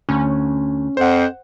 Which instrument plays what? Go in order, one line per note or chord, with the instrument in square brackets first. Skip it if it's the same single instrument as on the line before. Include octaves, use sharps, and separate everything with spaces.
[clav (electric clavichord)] D2 [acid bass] C#4
[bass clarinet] F2 [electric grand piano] C5 F#5